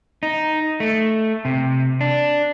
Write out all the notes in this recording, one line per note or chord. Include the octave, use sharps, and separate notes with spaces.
D#4
A3
C3
D4